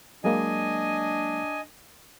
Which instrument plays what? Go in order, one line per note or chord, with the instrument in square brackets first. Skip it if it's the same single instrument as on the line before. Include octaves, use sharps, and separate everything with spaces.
[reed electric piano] F#3 G#3 A#3 [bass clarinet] D4 [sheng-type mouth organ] D#5 G#5